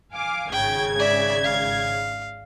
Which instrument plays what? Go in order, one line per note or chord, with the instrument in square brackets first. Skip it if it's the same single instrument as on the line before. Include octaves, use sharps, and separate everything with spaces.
[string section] F5 G#5 D6
[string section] G#1 C#3 G#6 [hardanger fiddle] G5
[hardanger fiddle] D5 E5
F5